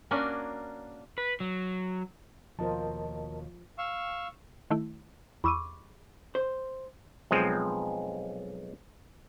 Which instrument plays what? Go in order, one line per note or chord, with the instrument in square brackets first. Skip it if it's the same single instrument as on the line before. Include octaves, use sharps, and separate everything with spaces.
[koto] A#3 C#4 D4 F#4 G#5
[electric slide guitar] B4
F#3
[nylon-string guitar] D#2 B2 [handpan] F3 F4 C5 [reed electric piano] A#4 D#5 A5
[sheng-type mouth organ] F5 C#6 E6
[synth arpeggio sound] D#3 A3 E4
[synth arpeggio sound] E2 E6 D#7 [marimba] B5 C#6 D6
[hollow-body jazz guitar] C5
[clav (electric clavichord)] B1 F3 G#3 C4